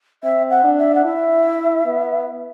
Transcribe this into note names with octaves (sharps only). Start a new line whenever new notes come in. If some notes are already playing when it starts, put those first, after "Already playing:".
C4 E5
F#5
D4
E5
F#5
E4 E5
B3